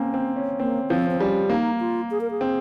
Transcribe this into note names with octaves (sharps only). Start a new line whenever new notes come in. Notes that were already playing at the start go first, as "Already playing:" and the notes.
Already playing: A#3 C4 C#4
C4
C#4
A#3 C4
F3 C4
C4
G3 C#4
A#3 D#4
F4
G#4
A#4
G#4
C4